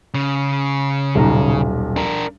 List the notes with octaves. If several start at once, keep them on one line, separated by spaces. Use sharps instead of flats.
C#3
D#1 B1 A#5
D4 A#4